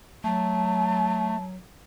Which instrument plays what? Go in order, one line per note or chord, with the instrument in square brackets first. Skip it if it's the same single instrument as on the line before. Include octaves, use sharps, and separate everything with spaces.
[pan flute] F#3 [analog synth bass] A3 [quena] A5